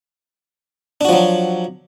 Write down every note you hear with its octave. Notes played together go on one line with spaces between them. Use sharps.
F3 F#3 D4 F#4